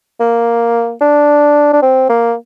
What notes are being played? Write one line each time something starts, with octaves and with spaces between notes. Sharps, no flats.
A#3
D4
D4
C4
A#3